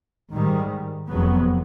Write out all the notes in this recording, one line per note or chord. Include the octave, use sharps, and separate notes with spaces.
G#2 D#3 G3
F1 F2 C#3 F#3 B3